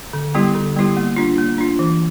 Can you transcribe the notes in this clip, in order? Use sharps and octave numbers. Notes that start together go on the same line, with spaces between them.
D3
G3 B3 E4 G4
D3
G3 B3 E4 G4
A#3
D4 F4
A#3
D4 F4
E3